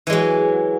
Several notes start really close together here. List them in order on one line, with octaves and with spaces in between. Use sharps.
E3 G#3 F#3